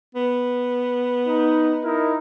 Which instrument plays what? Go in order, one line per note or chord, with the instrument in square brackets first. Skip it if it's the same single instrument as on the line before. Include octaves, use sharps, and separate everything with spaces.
[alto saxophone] B3
[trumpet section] D#4
D#4 E4 A#4